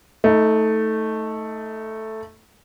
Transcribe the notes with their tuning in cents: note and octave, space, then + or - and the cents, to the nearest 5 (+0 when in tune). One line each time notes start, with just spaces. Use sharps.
A3 +0 D#4 +25